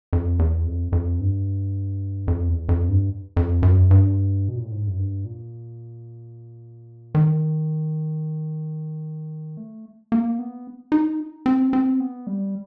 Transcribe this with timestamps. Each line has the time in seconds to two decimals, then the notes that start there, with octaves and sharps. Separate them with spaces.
0.13 F2
0.39 E2
0.66 F2
0.92 F2
1.20 G2
2.28 F2
2.48 E2
2.69 F2
2.88 G2
3.37 F2
3.63 F#2
3.91 G2
4.48 B2
4.57 A#2
4.63 A2
4.71 G#2
4.87 F#2
4.98 G2
5.25 A#2
7.15 D#3
9.57 A3
10.12 A#3
10.39 B3
10.92 D#4
11.46 C4
11.73 C4
12.00 B3
12.27 G3